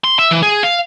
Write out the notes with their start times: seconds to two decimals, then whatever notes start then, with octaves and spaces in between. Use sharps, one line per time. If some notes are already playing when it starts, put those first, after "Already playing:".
0.04 C6
0.19 E5
0.31 E3
0.43 G#4
0.63 F5